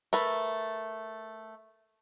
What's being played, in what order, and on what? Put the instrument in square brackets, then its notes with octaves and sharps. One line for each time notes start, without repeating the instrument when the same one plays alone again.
[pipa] A3 [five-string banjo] A#4 B4